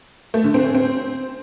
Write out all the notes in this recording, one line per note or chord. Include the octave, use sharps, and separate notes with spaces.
A3
D3
C4
C#4
C4